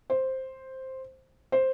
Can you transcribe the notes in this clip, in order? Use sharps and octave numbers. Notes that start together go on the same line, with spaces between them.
C5
C5